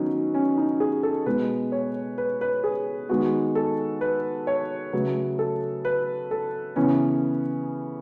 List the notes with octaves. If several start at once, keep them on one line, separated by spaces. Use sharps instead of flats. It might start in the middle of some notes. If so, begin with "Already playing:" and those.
Already playing: D#3 F#3 B3 C#4 D#4
C#4
D#4
G#4
A4
B2 G#3 B3 B4
C#5
B4
B4
G#4
D#3 G#3 B3 F#4
A4
B4
C#5
C#3 F#3 A3 B4
A4
B4
A4
C#3 E3 B3 C#4